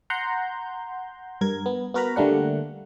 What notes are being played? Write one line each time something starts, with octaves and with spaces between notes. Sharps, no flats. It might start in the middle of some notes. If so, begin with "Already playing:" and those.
F#5 A#5 C6 G6
G2 A#4 G#6
B3
B3 F#4 A#4 B4 A#5 B5
D3 G3 A3 A#3 D4 F#5